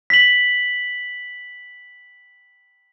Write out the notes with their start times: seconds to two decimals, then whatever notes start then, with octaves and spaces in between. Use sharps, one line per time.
0.10 B6 F#7